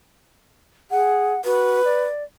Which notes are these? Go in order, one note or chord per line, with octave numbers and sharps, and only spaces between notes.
G#4 F#5
F#4 B4
D5